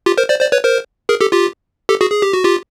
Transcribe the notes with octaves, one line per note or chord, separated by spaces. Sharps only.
F4 G4
A#4 C5
C5 D5
C5 D5
B4 C#5
A#4 C5
G#4 A#4
G4 A4
F4 G4
G4 A4
F#4 G#4
G#4
G4
F#4
F4 G4